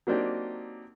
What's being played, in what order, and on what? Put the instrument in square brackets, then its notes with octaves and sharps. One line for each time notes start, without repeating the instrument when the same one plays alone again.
[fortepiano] F#3 A#3 C4 D4 D#4 G4